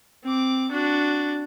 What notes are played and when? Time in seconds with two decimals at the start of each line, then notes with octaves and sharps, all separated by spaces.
0.23 C4 D6
0.71 D4 F#4